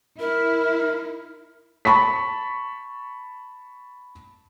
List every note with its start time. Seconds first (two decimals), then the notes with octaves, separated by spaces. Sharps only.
0.20 E4 A#4
1.85 A5 B5 C#6 B6